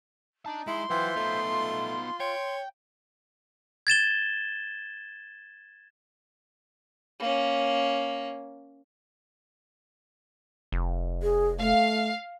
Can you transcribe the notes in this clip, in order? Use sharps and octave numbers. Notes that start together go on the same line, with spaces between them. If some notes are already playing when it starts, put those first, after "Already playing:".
D4 D#4 A5
G#3 E4 C6
E3 F#3 F4 C5 E5 G5
A3 B3 D#4
F4
C#5 G5
G#6 A6 E7 G7
A#3 C#4
F1
G#4
A3 F5